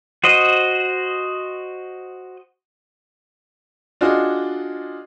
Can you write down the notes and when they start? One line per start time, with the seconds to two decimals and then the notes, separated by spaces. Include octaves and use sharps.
0.24 F#4 C5 D#5
4.01 D4 F4 F#4 G#4 D5 D#5